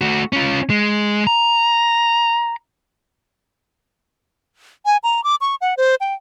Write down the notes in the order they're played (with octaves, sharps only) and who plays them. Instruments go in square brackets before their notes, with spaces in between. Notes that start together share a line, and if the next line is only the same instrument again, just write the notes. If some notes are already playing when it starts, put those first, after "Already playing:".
[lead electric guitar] A3 F#4
C#4 F4
G#3
A#5
[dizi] G#5
A#5
D6
C#6
F#5
C5
G5